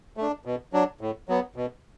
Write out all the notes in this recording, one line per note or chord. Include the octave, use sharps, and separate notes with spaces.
A3 D4
B2
F#3 D4
A2
F#3 B3
B2